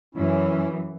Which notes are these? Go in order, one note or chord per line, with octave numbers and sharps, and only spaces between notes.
F#2 E3 C#4 E4